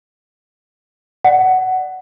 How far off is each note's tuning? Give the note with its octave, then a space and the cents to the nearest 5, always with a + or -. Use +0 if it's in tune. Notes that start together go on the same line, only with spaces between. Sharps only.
D5 +15 F#5 +10